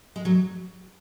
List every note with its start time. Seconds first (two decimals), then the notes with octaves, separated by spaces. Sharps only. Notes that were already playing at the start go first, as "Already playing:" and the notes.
0.16 G#3
0.25 F#3